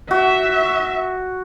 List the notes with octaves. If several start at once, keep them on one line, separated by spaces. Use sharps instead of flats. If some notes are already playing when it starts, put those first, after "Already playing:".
F#4 E5